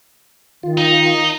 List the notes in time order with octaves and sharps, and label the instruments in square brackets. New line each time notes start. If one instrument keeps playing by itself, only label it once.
[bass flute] D#3 [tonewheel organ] F4
[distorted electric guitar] D#4